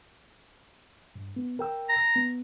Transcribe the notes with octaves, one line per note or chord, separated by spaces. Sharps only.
G2
B3
A#4 G5 E6
A#5
B3